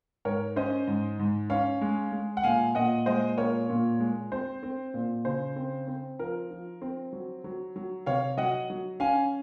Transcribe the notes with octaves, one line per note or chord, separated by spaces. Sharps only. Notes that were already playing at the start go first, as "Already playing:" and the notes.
G#2 A#4 C#5
C#4 C5 D#5
G#2
G#2
C#4 C#5 F5
G#3
G#3
F#5
A#2 F5 G#5
A#2 D#5 F#5
G#3 C5 D#5
A#2 A#4 C#5
A#2
G#3
C4 C5
C4
A#2
C#3 C5
C4
C4
F3 A#4
F3
C4
F#3
F#3
F#3
C3 C#5 F5
F#3 D#5 F#5
F#3
C#4 F5 G#5